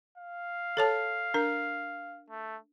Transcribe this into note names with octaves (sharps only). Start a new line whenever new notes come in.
F5
A4 C#5 A5
D4 A#4
A3